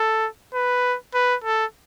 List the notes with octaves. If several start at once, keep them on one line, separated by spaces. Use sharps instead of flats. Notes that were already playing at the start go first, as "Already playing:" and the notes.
Already playing: A4
B4
B4
A4